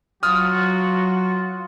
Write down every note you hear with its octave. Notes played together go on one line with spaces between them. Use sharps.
F#3 F4 F#4 D#6 F6